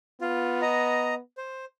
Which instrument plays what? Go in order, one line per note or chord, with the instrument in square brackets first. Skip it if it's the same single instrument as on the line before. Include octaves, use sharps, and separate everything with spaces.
[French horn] B3 [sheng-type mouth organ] F4
[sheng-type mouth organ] D#5 A#5
C5